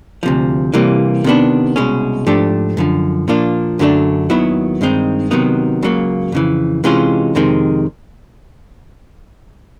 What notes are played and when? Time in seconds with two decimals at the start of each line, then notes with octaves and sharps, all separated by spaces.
0.23 D2 C3 F3
0.74 C2 C3 E3 G3 A#3
1.24 C3 D#3 G#3 B3 D4
1.76 C2 B2 G#3 C#4
2.27 G#2 F3 A3 D4 G4
2.77 F#2 D3 F3
3.28 A#2 F3 A#3 D4 F4
3.79 F#2 D3 F#3 A3 D4
4.30 D#2 D#3 F#3 B3 E4
4.81 G2 D#3 G#3 C4 D#4
5.31 C3 D#3 F#3 B3 D#4
5.83 C#2 C#3 F#3 A#3
6.32 F2 C#3 E3
6.84 C3 E3 G#3 C#4 F4
7.35 F2 C3 D#3 G#3